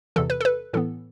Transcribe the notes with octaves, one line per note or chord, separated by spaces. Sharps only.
E2 C3 E3 A4
B4
A4
B4
A2 E3 B3 A4